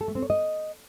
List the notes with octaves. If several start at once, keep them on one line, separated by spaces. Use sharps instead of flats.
A4
A3
C4
C#5
D#5